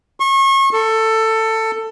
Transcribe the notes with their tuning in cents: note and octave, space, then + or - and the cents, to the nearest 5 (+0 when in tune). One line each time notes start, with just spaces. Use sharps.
C#6 -35
A4 +15